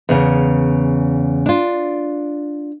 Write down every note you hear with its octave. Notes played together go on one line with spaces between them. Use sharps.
E2 C#3
D4 F4